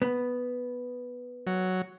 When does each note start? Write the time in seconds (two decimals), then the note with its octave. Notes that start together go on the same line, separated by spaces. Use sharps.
0.02 B3
1.47 F#3